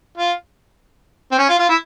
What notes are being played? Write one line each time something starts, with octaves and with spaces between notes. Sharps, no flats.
F4
C4
C#4
F4
F4
E4